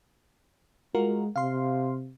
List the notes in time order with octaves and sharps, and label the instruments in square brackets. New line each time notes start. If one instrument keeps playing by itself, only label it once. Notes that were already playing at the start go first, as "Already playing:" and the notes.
[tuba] G#3 [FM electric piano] F4 F#4 A#4
[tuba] C3 [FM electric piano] F5 C6